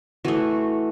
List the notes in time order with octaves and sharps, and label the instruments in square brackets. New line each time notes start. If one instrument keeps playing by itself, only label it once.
[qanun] E3 A3 F#4